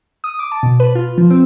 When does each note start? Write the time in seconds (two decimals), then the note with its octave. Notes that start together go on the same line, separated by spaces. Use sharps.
0.24 D#6
0.39 D6
0.52 A5
0.63 B2
0.80 B4
0.95 F4
1.18 F3
1.30 C4